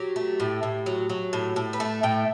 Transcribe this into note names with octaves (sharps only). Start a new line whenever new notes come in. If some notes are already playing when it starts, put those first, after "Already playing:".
Already playing: F#3 G4
A3
A2
A2
F#3
F#3
A2
A2
B4
A3 A4
A2 G5